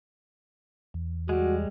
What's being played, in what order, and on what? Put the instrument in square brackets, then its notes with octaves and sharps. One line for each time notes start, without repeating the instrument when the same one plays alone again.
[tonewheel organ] E2
[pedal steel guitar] G3 G#3 [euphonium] F#4